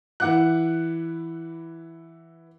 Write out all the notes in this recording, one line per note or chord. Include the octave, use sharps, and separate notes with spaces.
E3 E4 F#5 D6 F#6